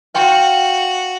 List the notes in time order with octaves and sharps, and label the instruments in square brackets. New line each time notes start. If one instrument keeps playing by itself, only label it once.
[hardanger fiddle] F#4 [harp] F5 G5 C#6